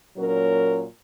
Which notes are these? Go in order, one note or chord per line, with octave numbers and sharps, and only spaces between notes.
A#2 F#3 C#4 A#4